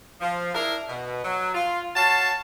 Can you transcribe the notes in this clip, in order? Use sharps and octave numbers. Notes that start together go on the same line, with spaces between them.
F3
D4 E4 G#4 A#4
B2
F#3
F4
F#4 C#5 F5 A5